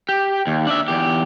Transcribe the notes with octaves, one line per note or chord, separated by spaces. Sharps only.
G4
D#2
D4 E5
E2 G4